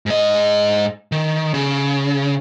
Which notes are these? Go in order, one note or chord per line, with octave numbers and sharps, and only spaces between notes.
G#2 D#5
D#3
C#3